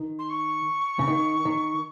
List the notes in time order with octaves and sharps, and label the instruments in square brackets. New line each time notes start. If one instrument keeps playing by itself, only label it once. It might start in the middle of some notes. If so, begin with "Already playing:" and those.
Already playing: [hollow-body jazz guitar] D#3
[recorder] C6
C#6
[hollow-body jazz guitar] C#3
D#3
D#3